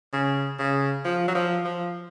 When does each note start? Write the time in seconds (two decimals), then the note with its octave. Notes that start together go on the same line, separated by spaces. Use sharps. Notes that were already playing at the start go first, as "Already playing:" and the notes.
0.13 C#3
0.59 C#3
1.05 F3
1.28 F#3
1.35 F3
1.65 F3